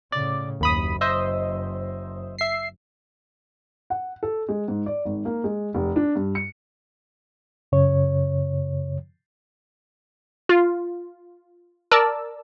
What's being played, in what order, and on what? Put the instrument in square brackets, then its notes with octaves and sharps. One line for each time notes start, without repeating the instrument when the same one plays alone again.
[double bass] A2 C#3 [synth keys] D5
[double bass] F#1 [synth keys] D#2 B5 D#6
[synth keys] C5 D#5 E5
E5 C7
[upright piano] F#5
A4
G#3
G#2
D5
G#1
A#3
G#3
F1
D4
G2
C#7
[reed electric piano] F#2 C#3 C#5
[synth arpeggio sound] F4
A#4 D5 A5 E6